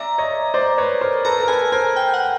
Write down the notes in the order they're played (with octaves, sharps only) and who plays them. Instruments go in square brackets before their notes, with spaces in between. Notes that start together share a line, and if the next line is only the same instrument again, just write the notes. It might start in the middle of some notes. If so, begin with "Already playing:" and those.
Already playing: [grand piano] D5 E5 [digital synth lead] A#5
[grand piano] C#5 D#5
C5 D5
B4 C#5
A#4 C5
[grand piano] A4 B4 [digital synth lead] A#5
[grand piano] A#4
[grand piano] A4 B4 [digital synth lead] G#5
[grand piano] A#4 C5 [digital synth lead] G#5
[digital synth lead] G5
F#5